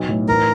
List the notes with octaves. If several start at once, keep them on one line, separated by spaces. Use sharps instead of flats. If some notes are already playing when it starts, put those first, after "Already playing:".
Already playing: B1
A2
A1 A#4